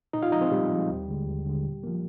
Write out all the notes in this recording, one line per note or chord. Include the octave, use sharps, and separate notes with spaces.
A#2 D#4 D#5
F4 F5
F3 G#3 D#4 D#5
C4 C5
A#2 G3 G4
F3 G#3
D#2
D3 G#3
D#2
D3 G#3
A#2
F3 A#3